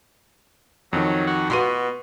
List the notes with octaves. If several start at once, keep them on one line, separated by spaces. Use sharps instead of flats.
F2 D#3 F#3
F#4
B2 B3 F4 F#4 C6 D#7